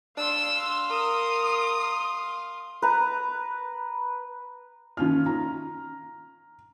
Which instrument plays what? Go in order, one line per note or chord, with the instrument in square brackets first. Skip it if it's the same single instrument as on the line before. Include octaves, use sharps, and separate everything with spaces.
[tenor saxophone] D4 [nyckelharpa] F5 C6 [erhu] E6
[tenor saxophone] A#4 [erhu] D#6
[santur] B4 A#5
[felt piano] D#3 C#4 F4 F6
A#5